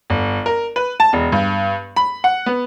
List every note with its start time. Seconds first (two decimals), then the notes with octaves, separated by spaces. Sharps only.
0.10 G1
0.46 A#4
0.76 B4
1.00 A5
1.13 E1
1.32 G2
1.96 B5
2.24 F#5
2.46 B3